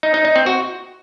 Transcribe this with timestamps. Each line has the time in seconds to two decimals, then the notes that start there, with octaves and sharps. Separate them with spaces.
0.03 D#4
0.14 D#4
0.25 D#4
0.36 C4
0.46 F#4